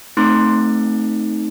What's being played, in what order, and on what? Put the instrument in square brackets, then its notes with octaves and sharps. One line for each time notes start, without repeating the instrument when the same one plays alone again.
[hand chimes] A3 C4 D#4 C6